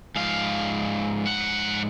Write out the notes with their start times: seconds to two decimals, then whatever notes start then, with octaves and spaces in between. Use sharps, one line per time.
0.16 G#2 F3 F5
1.27 F#5